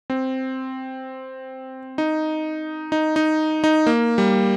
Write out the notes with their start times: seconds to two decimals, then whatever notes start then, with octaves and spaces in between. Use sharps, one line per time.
0.10 C4
1.98 D#4
2.92 D#4
3.16 D#4
3.64 D#4
3.87 A#3
4.18 G3